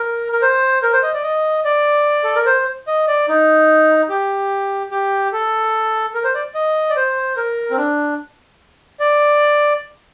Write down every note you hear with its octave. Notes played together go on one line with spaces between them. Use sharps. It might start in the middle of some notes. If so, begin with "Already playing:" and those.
Already playing: A#4
A#4
C5
A#4
C5
D#5
D5
D#5
D5
A4
A#4
C5
D#5
D5
D#4
G4
G4
A4
A#4
C5
D5
D#5
D5
C5
A#4
C4
D4
D5